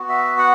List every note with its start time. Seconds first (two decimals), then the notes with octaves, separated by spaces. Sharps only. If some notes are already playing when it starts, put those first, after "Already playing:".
Already playing: B3 F#4
0.09 E5
0.38 F#5